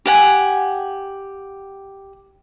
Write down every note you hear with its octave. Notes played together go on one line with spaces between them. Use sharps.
G4 F#5 G#5